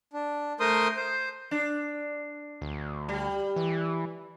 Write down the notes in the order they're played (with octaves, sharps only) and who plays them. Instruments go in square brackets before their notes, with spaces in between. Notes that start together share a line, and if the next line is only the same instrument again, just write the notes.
[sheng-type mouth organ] D4
A3 A#4 C5 C6 D#6
C5
[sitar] D4
[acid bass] D2
[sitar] G3
[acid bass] E3